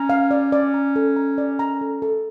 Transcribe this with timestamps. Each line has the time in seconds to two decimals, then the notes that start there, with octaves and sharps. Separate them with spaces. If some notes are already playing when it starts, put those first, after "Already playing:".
Already playing: C#4 A#5
0.09 F5
0.31 D5
0.52 D5
0.74 A#5
0.96 A4
1.16 A#5
1.38 D5
1.59 A#5
1.81 A4
2.02 A4